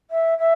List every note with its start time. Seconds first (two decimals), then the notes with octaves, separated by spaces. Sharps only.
0.10 E5
0.38 E5